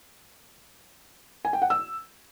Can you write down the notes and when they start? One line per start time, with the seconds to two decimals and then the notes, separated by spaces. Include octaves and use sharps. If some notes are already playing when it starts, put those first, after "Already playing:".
1.45 G#5
1.53 G5
1.62 F#5
1.70 E6